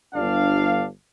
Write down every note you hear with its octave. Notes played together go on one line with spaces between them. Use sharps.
G1 D4 F5